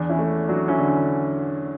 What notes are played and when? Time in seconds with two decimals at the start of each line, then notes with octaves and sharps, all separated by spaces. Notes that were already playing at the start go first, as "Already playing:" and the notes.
Already playing: E2 D4
0.09 C#4 E4
0.19 A3
0.48 F#3 D4 F#4
0.68 C#4 E4
0.78 D3
0.88 C#4